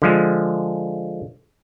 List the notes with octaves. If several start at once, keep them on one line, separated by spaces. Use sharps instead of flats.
D3 F3 G#3